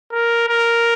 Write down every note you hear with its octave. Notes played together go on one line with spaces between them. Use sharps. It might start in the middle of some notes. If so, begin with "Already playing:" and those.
A#4
A#4